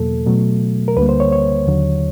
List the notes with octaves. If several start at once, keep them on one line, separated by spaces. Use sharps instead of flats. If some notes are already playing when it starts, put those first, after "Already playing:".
Already playing: E2 B2 F#3 A#3 A4
B2 F#3 A3
A#4
D2 D3 G3 A#3 B4
C5
C#5
C#5
D#2 D3 F#3